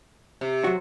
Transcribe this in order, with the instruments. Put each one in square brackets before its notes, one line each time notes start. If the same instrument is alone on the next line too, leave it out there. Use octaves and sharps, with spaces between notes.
[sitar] C3
[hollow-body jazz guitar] F#3 F#4